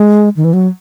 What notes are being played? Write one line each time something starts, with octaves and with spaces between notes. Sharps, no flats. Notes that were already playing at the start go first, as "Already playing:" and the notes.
Already playing: G#3
D#3
E3
F#3